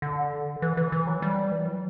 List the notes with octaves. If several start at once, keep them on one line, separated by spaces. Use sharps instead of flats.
D3
E3
E3
E3
F#3
G3
E3
F#3